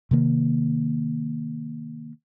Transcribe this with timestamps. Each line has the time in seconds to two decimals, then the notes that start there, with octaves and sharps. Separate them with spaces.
0.11 C3 D#3 A#3